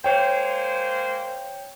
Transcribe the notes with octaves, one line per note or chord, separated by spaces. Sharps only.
G#3 A#3 C5 C#5 G5